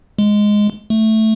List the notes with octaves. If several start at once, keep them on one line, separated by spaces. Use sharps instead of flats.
G#3
A3